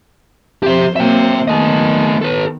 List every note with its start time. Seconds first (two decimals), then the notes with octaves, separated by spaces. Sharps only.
0.63 F2 G4 C5 E5
0.96 F#3 A#3 C4 E5 G5
1.48 D#3 A3 B3 D#5
2.22 A4 B4